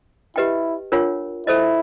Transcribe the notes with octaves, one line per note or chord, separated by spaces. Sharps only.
E4 G4 B4 D#5 G5
D4 F4 A#4 C#5 F#5
E4 A4 C5 D#5